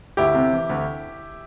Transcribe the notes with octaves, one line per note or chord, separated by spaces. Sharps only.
D2 E4 G4
C3
E3
D2